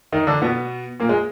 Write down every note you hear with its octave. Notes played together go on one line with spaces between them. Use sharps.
D#3 D#4
D3 D4
B2 B3
A#2 A#3
G#3